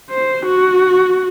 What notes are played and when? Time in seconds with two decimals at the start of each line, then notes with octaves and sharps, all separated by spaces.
0.10 C5
0.46 F#4